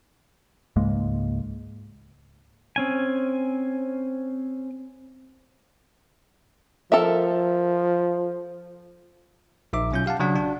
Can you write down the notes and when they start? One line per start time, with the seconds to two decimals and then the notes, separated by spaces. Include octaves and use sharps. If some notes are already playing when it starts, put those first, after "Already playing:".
0.76 C#2 G#2 G#3 A#3
2.76 C4 C#4 G#5
6.92 F3 A4 A#4 E5
9.73 A#1 D#4 E5 D6
9.92 B2 F#3 C#4 F4 G6
10.06 G4 F5 F#5 A5
10.19 C#3 F#3 D4 F#5
10.36 D4 F#4